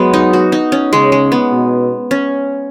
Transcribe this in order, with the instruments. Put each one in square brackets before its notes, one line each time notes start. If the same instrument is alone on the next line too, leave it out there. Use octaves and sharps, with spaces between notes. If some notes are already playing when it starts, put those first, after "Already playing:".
Already playing: [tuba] F#3 [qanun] G#3 B3
[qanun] D#4
F#4
D#4
C#4
[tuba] C#3 [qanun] G#3
[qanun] G#3
B3
[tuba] B2
[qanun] C#4